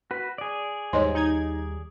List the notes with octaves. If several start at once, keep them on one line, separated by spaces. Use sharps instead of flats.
F#4 B4
G#4 D5
D#2 G#2 G3 C#5 D#5 C6
D#4 G#6